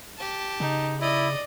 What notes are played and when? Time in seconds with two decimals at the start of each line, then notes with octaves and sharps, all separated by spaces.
0.17 G4 A5
0.60 C#3 D#4
1.01 E4 D5 D#5